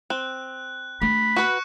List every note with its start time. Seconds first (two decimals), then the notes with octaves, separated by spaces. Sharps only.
0.10 C4 F#6
1.01 A3 D4 B5
1.36 F#4 B4 C#6 F#6 C#7